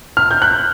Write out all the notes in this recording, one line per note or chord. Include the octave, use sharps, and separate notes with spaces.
F6
G6
F#6